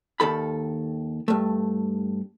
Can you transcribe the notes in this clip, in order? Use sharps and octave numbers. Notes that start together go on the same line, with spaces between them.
D#2 D#3 A4 B5
G2 A3